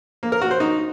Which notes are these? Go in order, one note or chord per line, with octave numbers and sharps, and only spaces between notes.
A#3
A#4
F#4
C5
D#4